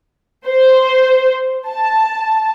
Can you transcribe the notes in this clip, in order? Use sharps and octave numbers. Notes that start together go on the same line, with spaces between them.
C5
A5